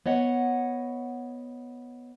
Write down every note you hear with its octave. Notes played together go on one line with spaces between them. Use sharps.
B3 C#5 D#5 F#5